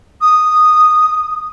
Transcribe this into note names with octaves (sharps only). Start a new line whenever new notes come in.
D#6